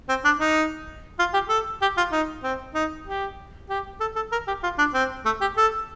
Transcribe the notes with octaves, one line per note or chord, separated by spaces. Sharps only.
C4
D4
D#4
F4
G4
A4
G4
F4
D#4
C4
D#4
G4
G4
A4
A4
A#4
G4
F4
D4
C4
A3
G4
A4